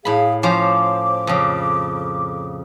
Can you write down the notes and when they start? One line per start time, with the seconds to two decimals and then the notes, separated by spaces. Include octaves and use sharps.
0.05 A2 G#4 F5 B5
0.43 F3 C#4 C5 D6
1.27 F2 C#3